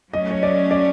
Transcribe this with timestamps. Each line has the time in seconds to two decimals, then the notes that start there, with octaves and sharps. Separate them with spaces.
0.13 F#3 A3 C#4 D#5
0.31 C#5
0.43 D5
0.71 D5